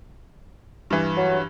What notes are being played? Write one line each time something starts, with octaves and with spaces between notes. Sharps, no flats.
G2 E3
F#3